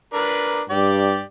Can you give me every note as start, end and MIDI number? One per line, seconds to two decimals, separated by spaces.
0.14 0.61 62
0.14 0.61 70
0.14 0.61 71
0.70 1.22 43
0.70 1.21 67
0.70 1.21 74